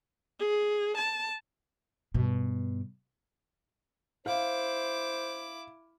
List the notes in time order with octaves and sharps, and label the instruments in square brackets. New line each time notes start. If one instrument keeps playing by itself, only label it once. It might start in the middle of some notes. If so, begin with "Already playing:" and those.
[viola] G#4
A5
[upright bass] G2 B2
[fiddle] E4 D6 [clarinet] C5 [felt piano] F5